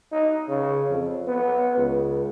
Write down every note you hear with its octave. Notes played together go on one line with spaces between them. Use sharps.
D#4
C#3
F2
B3
C#2